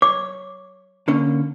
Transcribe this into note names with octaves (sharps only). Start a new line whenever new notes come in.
C#5 D6
D3 A#3 C#4